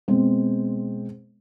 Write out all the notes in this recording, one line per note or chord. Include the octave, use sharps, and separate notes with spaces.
B2 G#3 C4